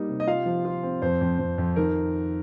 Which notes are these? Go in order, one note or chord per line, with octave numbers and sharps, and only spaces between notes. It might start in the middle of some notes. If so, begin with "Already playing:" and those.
Already playing: G3 A#3 D#4
C3
D#5
F4 F5
F3
F4
C4
F2 C5
F2
F2
F2
D#3 A#4